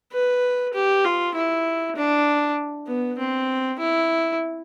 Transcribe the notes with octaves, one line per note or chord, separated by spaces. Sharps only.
B4
G4
F4
E4
D4
B3
C4
E4